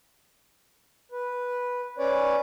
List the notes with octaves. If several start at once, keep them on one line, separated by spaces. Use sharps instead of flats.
B4
C#4 B4 C#5 D5